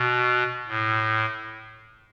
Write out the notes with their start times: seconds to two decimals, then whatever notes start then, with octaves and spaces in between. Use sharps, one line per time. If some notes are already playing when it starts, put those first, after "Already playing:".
Already playing: B2
0.67 A2